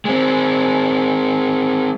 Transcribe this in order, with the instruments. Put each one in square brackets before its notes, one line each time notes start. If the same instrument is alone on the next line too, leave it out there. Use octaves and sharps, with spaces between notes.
[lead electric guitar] G#3 C4